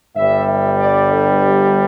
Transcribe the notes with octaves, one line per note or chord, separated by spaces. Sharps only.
G1 G2 G3 E5
E5
D5
A4
G4